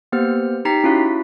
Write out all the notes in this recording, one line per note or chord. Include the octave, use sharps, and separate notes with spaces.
A#3 B3 G4 C5 F6
D#4 G4 G5 A#5 B6 C7
C#4 E4 F#4 F5